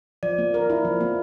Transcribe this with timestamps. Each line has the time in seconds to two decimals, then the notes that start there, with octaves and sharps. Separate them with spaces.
0.23 F3 D5
0.38 A#3
0.54 A#4
0.70 E4
0.85 F3
1.00 A#3